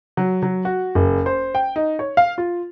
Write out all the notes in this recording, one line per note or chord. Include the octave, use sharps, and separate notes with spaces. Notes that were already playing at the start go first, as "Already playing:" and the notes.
F#3
F#3
F#4
F#1
C5
G5
D#4
C#5
F5
F4